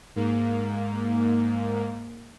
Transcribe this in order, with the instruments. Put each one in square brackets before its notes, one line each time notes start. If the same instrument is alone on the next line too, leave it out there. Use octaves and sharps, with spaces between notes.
[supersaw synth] G#2 A#3